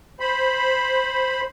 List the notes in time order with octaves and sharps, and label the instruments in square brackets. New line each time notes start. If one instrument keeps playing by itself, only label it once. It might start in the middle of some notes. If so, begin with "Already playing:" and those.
[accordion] C5 B5